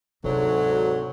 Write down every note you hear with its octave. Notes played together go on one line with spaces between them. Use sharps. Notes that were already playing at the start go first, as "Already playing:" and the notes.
D2 G#2 C3 F#3